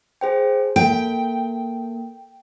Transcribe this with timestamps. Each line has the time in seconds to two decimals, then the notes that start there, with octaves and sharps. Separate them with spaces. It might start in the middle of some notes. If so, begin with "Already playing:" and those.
0.21 G#4 C5 G5
0.76 A#3 A4 G5